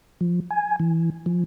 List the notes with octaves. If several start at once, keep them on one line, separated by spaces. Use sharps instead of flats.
F3
G#5
E3
F3